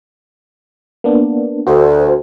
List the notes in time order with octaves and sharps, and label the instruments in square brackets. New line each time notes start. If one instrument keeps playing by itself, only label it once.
[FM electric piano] A#3 B3 D4
[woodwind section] D2 [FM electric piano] F#4 C5